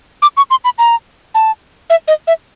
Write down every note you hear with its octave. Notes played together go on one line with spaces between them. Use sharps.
D6
C#6
C6
B5
A#5
A5
E5
D#5
E5